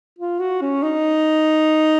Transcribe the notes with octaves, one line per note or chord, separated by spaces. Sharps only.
F4
F#4
C#4
D#4